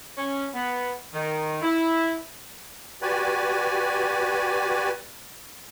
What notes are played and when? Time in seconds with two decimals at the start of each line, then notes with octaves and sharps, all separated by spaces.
0.18 C#4
0.53 B3
1.14 D#3
1.62 E4
3.02 F#4 G4 B4 D5 G#5